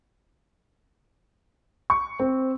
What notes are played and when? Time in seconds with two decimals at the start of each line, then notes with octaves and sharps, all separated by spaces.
1.90 C#6
2.19 C4